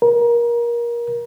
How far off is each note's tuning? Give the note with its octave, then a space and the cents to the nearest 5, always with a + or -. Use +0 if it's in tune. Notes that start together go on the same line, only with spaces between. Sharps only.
A#4 +25